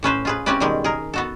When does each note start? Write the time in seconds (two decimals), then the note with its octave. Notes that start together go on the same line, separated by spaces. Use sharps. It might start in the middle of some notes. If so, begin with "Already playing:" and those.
0.03 A2 C#4 B4 C5
0.25 F4 G#4 B4
0.46 G3 C4 C#4 E4 B4 D5
0.60 B2 D#3 G3 G#3
0.84 G#4 A#4
1.14 B3 F#4 A4